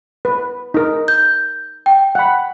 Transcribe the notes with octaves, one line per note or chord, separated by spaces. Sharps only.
B4
D#4 A#4
G6
G5
F#5 B5